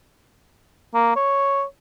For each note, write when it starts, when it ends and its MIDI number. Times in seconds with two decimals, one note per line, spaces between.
0.94 1.13 58
1.16 1.63 73